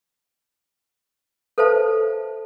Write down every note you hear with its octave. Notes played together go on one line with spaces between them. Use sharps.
A4 B4 C5 E5 F5 A5